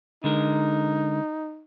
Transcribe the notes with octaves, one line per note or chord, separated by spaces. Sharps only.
D3 G#3 D#4 A#4